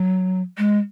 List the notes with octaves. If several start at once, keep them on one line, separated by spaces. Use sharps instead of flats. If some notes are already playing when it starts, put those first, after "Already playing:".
Already playing: F#3
G#3